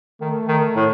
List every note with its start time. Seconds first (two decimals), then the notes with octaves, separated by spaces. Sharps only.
0.21 D#3 A3
0.48 D#3
0.76 A2